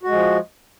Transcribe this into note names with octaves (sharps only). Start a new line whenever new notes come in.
F3 G#3 F#4